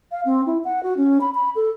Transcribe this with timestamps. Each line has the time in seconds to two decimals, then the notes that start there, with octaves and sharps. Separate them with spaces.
0.12 F5
0.25 C4
0.46 E4
0.64 F#5
0.83 F#4
0.97 C#4
1.21 B5
1.35 B5
1.56 A4